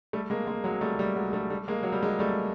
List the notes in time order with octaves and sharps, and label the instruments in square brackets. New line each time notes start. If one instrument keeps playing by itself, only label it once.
[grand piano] G3 A3
G#3 A#3
G#3 A#3
F#3 G#3
G3 A3
G3 A3
F#3 G#3
G3 A3
G3 A3
G#3 A#3
F#3
G3
F#3 G#3
G3 A3